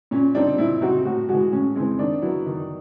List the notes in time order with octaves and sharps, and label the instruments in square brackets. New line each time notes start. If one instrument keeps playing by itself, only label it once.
[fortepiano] A#2 [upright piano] C#4
[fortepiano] G3 C4 D#4 [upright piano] D4
[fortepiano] A#2 [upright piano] E4
[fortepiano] G3 C4 D#4 [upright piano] F#4
[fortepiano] A2 [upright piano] F#4
[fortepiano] E3 G#3 [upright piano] F#4
[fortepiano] A2 [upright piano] C#4
[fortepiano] E3 G#3 [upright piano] C4
[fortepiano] D#3 [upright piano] D4
[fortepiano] F#3 B3 E4
D#3